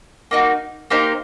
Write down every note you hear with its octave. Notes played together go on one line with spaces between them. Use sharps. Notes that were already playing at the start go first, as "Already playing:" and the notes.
A#3 D#4 F#4
A#3 D#4 G4 C5